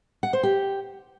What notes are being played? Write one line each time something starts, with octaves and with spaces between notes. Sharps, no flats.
F#5
C5
G4